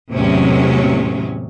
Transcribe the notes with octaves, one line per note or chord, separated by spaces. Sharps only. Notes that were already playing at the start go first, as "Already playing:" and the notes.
E2 A2 C3 F#3 G#3 C#4